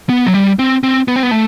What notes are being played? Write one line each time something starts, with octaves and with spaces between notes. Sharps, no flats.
B3
F#3
G3
C4
C4
B3
C4
B3
A3